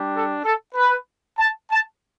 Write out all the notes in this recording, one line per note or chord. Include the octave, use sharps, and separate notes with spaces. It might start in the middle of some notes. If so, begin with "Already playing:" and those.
Already playing: G3 D4 G4
A4
A4
B4
A5
A5